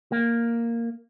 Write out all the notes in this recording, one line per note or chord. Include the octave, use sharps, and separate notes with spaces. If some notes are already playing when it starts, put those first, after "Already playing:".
A#3